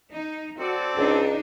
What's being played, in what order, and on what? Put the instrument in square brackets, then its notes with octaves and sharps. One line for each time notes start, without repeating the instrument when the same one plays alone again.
[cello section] D#4
[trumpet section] C4 A4 D5 [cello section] F#4
[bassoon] C#2 [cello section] D4 D#4